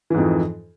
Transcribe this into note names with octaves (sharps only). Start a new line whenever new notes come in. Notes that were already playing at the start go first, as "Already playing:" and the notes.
F2 G#2 E3